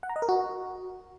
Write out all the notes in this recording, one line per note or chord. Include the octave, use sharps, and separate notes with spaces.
F#5
A#5
D#5
A#4
F#4